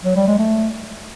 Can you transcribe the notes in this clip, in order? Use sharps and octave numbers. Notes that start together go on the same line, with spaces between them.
F#3
G3
G#3
A3